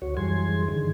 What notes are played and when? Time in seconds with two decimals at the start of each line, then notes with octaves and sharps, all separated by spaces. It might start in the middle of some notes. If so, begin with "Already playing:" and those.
0.02 D2 F#4 C#5
0.17 F#2 E3 G3 G#4 C6 G#6
0.68 G2 D3 D#3